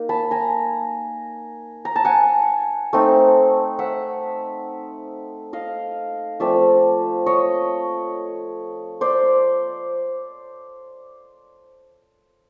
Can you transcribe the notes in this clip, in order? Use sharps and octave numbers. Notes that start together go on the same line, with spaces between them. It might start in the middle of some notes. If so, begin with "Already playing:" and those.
Already playing: A#3 D#4
A5 B5
G#5 A#5
A#5
A5
F#5 G#5
A3 C4 D#4
E5 F#5
D#5 F5
F3 A3 C4 D5 E5
C#5 D#5
C5 D5